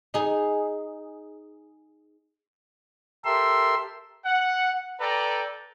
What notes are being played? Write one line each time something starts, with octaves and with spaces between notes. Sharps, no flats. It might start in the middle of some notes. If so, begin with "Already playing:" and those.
D#4 G#4
G4 A4 A#4 E5 C6 E6
F#5
A4 B4 D5 G5 A#5